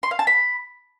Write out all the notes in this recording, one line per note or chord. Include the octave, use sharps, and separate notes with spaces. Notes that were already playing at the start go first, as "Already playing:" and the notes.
C6
F5
A5
B5